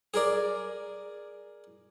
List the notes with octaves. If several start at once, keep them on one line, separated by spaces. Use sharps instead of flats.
G#4 A#4 D5